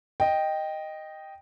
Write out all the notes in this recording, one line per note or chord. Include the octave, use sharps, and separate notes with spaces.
D#5 G5